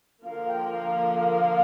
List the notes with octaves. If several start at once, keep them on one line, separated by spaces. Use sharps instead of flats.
D3 F3 A#3 F4 A#4 F5
G5
F5